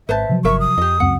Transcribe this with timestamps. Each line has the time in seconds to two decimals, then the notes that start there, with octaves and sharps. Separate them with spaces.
0.09 G#1 B4 C5 E5 A5
0.29 C3 F3 F#3
0.45 G1 A#4 E5 C#6
0.60 D#6
0.78 F2 G4 D#5
1.00 C#2 F#2 C4 F#5